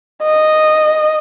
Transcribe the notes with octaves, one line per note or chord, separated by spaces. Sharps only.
D#5